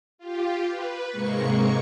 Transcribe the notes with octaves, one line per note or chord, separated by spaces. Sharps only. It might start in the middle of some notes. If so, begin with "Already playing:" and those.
F4 G4
B4
G#2 C3 G#3 A#3 C#6 C#7